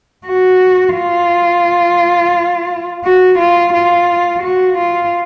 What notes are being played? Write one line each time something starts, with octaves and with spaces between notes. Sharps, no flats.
F#4
F4
F#4
F4
F4
F#4
F4